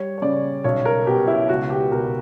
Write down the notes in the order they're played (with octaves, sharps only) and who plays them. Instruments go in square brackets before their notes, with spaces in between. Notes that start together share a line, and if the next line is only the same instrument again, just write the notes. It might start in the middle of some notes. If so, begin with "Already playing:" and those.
Already playing: [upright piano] G3 C#5
C#5
C#3 D5
B1 C#5
A#4
B2 G4
E4
C#2 F#4
G4
B2 A#4